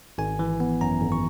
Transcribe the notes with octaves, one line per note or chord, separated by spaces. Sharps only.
G#1 G#5
E3
B3
F#2 A#5
G#1
C#6